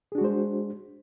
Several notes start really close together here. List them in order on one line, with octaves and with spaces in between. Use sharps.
G#4 D4 F#4 G#3 C5